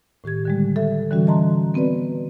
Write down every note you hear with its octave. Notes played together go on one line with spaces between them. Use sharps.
A2 D#3 G4 G#6
D3 G3 G#3
A4 E5
D3 E3 G3 C#4 F#4
D#5 A5 A#5 C6
B3 C4 F#4 B4 D5